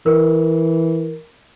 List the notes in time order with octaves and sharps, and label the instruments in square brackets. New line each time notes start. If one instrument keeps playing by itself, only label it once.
[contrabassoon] E3 [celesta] A#4